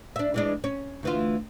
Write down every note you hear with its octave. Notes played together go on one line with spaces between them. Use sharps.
D4 E5
E3 G#3 D4
C#4
D2 E3 F4